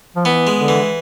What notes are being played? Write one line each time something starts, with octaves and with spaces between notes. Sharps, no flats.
F3
E3 B3
G#3
D3
E3